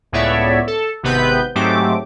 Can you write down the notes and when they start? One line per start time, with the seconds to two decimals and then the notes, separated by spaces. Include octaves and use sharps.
0.12 C#2 A2 B3 C#5 D5 E5
0.67 A4
1.03 G#1 C3 B3 B4 G6
1.55 G#2 F#3 A3 C4 G4 D6